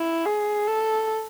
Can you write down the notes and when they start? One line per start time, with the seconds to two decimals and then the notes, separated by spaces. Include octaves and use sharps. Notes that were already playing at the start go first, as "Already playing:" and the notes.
Already playing: E4
0.26 G#4
0.67 A4